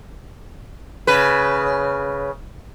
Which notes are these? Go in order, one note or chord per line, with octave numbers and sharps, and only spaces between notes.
C#3 B4